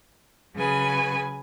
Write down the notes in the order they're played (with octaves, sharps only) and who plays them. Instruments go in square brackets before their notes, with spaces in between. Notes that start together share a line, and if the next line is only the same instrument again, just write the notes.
[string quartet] C#3 F#3 G#4 B4 G#5